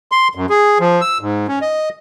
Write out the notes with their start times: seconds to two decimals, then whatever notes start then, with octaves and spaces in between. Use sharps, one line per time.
0.12 C6
0.35 F#2
0.50 G#4
0.80 F3
1.01 E6
1.21 G#2
1.48 C#4
1.62 D#5